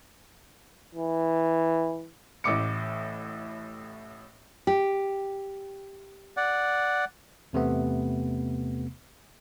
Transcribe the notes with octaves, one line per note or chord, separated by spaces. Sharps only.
E3
A1 A2 D6 C#7
G4
D5 F#5
E2 C3 A3 B3